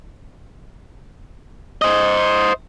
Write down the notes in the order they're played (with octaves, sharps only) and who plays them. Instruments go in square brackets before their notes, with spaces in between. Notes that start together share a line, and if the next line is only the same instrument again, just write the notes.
[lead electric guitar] C5 D#5